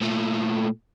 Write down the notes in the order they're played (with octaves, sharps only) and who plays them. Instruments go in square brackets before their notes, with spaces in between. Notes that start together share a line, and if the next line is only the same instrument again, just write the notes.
[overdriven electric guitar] A#2 A3